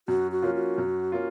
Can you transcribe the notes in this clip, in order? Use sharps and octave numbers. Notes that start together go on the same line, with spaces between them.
F#2 F#4
F#4
F3 A#3 C#4 F4
F#4
F#2
A#3 C#4 F4